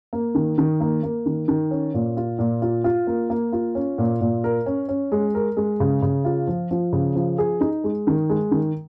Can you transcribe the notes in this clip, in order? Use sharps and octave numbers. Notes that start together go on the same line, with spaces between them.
A#3
D#3
D#3
A#3
A#3
D#3
D#3
C#4
A#2
F4
A#2
F4
F4
A#3
A#3
F4
C#4
A#2
A#2
A#4
C#4
C#4
G#3
A#4
G#3
C#3
C#3
F4
F3
F3
C#3
F3
G#4
D#4
G#3
D#3
G#3
D#3